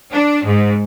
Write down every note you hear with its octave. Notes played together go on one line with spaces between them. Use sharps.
D4
G#2